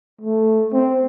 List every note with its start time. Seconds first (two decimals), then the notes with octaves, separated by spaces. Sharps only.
0.21 A3
0.73 C4